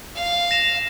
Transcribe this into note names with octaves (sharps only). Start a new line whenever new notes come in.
F5
A#6 E7 F7